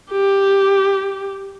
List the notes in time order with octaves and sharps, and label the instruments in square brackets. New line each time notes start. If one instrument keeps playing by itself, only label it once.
[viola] G4